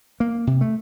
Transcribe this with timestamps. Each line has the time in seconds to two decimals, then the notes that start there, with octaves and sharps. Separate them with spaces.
0.20 A#3
0.47 C3
0.61 A3